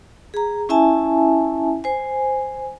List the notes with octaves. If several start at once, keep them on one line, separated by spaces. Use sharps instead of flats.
G#4 A#5
C#4 E4 E5 G#5 A5
C5 G#5